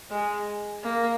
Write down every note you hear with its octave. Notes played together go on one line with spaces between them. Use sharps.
G#3
A#3